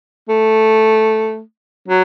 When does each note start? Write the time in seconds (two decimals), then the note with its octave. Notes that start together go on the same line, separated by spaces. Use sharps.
0.29 A3
1.88 F#3